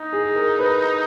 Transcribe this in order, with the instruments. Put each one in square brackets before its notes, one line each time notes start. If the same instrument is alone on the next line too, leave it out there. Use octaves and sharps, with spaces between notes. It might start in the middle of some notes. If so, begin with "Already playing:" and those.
Already playing: [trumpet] D#4
[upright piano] G#4
A#4
B4